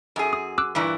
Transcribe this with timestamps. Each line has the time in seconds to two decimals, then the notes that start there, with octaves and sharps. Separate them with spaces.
0.16 F#2 G#4
0.33 D#6
0.58 D6 E6 F#6
0.75 G2 A#2 E3